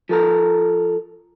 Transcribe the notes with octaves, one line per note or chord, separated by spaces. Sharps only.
F3 A4 A#4